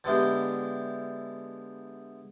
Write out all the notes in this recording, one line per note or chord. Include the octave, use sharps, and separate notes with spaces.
D3 G#3 B3 E4 G4